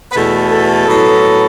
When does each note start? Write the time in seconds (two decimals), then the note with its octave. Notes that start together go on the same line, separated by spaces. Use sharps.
0.11 B4
0.15 E2 B2 A3 A4
0.51 A4
0.86 A2 F#3 B3